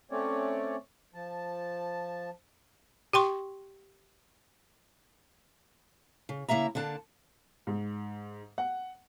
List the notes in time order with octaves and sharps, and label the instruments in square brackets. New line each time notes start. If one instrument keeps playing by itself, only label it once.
[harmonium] A3 C4 C#4 C#5 D5
F3 A5
[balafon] G4 G5 C6 C#6
[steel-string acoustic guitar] C#3
C#3 A#3 E4 E5 A#5
D3 A#3 D4 A5
[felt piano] G#2
F#5